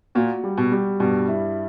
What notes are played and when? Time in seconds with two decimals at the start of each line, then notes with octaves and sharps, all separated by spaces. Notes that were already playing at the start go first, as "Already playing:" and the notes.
0.15 A#2 F#4
0.44 G3
0.57 B2
0.72 G3
1.00 G2 B2
1.28 E4